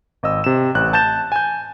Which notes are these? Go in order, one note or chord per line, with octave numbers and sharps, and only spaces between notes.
G#1 D#5 E6
C3 E7
A1 F#6
A5 G6 A6 E7
G#5 G6